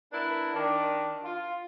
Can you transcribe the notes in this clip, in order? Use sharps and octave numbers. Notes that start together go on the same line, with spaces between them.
B3 D4 E4 A#4
D#3 D4
F4